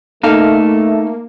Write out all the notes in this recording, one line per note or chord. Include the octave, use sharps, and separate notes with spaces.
A3 A#3 D#4 A4 F5